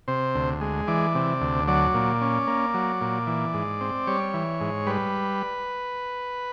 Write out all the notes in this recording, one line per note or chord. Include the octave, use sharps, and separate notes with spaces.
C3 C5
D2
G#3
E3 D5
C3
D2
F#3 D5
A#2
C#4
A#3
F#3
A#2
E3
G#2
C4
G3 C#5
E3
G#2
G3 B4